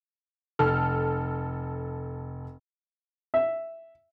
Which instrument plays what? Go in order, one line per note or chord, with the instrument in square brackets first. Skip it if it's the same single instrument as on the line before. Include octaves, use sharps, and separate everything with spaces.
[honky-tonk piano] F1 A4 F6
[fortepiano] E5